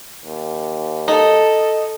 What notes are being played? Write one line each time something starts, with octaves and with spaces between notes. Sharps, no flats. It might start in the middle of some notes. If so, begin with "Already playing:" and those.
D#2
D#4 A4 D#5